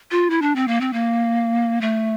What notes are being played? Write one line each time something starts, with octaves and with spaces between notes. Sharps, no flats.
F4
E4
D4
C4
A#3
C4
A#3
A3